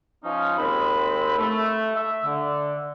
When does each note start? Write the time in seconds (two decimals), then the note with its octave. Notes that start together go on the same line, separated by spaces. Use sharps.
0.24 F3 C#4 D#4
0.58 D#2 G#3 C4 B5
1.38 A3
1.96 E5
2.25 D3